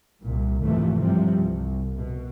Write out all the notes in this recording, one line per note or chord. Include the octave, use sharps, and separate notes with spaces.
C2 A#2
G#1 D#2 C3 E3 F3 A3
G2 C3 F3 G3
C2
B2